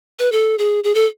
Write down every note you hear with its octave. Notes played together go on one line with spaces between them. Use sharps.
B4
A4
G#4
G#4
A4